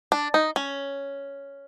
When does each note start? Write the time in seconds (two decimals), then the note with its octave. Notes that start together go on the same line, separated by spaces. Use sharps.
0.12 D4
0.34 D#4
0.56 C#4